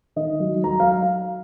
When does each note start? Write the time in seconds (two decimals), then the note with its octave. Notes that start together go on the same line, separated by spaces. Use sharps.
0.16 D#3 D#5
0.40 F#3
0.64 F#3 A#5
0.80 F5